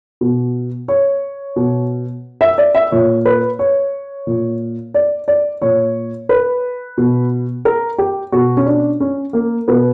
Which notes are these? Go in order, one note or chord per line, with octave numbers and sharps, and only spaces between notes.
B2
C#5
B2
E5
D5
E5
A#2 C#5
B4
C#5
A#2
D5
D5
A#2 C#5
B4
B2
A#4
G4
B2 F#4
C#4
D4
C#4
A#3
B2 B3